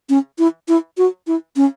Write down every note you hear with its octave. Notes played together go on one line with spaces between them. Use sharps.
C#4
E4
E4
F#4
E4
C#4